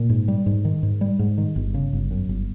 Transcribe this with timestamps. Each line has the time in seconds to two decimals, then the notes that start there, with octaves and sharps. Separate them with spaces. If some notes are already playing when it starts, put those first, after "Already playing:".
Already playing: A#2
0.09 G#2
0.28 G3
0.46 G#2
0.65 D#3
0.83 G#2
1.01 G3
1.19 G#2
1.38 D#3
1.56 G1
1.74 C#3
1.93 G1
2.11 F#2
2.29 G1